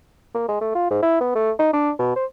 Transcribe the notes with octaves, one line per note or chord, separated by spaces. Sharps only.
A#3
G#3
A3
F4
G#2
E4
B3
A3
D#4
D4
B2
C5